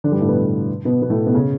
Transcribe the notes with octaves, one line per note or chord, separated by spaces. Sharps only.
D3 D4
G2 G3
A2 A3
B2 B3
B2 B3
B2 B3
A2 A3
B2 B3
C#3 C#4